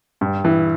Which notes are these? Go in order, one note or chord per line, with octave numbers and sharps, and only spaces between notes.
G2
E3